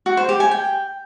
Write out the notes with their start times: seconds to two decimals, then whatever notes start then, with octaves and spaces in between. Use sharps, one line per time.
0.06 F#4
0.17 C5
0.29 G4
0.40 G#5
0.51 G5